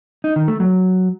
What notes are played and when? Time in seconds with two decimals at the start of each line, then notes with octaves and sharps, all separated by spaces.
0.24 D#4
0.36 D#3
0.48 A3
0.60 F#3